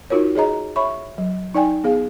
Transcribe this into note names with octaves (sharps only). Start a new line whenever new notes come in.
D#4 F4 F#4 A#4 C#5
G#4 C#5 D#5 A#5
C#5 E5 B5 C#6
F#3
D#4 D5 G5 G#5
B3 G#4 F5